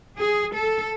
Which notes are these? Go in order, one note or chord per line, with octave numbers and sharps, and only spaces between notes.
G#4
A4